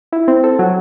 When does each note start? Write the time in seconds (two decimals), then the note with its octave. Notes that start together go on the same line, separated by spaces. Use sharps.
0.12 E4
0.28 C4
0.44 A4
0.59 F#3